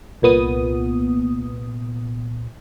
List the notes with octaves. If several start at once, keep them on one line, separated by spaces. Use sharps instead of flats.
C2 A#2 B3 D#6